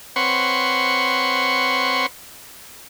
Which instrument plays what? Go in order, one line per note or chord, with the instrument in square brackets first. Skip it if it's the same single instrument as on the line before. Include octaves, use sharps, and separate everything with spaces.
[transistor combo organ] C4 B4 C#5 F#5 C6 C#6